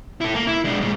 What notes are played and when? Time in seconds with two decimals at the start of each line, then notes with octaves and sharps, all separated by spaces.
0.21 E4 A4
0.35 A#3
0.47 E4
0.64 G#3 D4
0.81 A#2 G#3